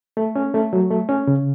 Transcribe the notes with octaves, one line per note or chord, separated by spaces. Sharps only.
A3
C#4
A3
F#3
A3
C#4
C#3